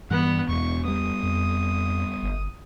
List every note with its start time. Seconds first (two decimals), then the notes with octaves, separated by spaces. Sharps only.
0.10 G2 E3 B3 F#5
0.49 E1 E2 C#6
0.85 G3 B3 D#6
1.23 F2
2.23 G1